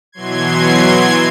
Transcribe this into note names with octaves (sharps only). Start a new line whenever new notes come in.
B2 E3 F#3 C6 G#6